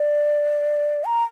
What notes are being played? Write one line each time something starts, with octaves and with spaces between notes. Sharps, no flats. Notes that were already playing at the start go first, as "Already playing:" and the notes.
Already playing: D5
A#5